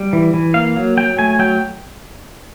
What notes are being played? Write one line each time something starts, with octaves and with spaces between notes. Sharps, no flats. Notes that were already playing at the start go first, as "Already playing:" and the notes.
Already playing: G3
E3
E3
A#3 F5
F#3
F#3 G5
A3 G#5
F#3 G5